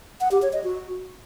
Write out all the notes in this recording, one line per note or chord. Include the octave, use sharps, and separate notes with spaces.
F#5
G4
C#5
D#5
F#4